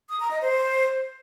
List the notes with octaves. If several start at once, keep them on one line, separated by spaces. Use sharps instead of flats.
D#6
A#5
D#5
C5